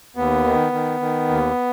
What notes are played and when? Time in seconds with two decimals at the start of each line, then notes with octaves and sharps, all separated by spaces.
0.16 D#2 B3
0.45 D#3
0.73 D#3
1.00 D#3
1.29 D#2